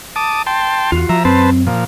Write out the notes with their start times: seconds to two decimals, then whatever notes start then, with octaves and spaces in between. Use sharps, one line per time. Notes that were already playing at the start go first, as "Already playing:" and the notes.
0.16 A5 D6 D#6
0.46 G5 A5 C6
0.92 E2 F4 F#4
1.09 F3 E5 A#5
1.25 F#2 C4 B4 C5 A5
1.67 A#2 F3